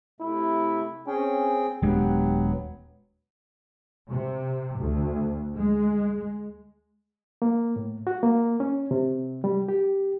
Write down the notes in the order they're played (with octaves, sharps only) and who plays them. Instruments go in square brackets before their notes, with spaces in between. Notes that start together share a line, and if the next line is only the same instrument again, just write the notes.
[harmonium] C3 A3 [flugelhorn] E4
[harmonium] C4 G#4 G5 [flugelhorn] C#4
[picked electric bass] D#1 G#3 D4 [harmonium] F#3 B3 [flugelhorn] G4
[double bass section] C3
D2
G#3
[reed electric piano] A#3
A2
F#4
A#3
C#4
C3
G3
G4